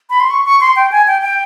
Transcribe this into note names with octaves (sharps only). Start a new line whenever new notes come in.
B5
C6
C#6
C#6
C6
G5
G#5
G5
G5